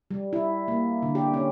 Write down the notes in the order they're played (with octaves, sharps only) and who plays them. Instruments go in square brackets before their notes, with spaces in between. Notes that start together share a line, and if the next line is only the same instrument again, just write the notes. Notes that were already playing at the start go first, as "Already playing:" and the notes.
[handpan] G3
E4
A#3
D3
G4
C#4